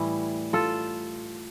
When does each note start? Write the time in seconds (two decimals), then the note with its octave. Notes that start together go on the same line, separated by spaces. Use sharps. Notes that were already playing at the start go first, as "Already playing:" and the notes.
Already playing: A2 E3 G3 E4
0.53 F4 A4